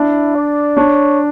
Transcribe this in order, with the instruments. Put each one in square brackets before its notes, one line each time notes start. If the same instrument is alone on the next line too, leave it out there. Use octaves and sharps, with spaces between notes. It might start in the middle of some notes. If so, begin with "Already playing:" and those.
Already playing: [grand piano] D4 [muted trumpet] E4
[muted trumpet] D5
[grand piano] D4 [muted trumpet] C#5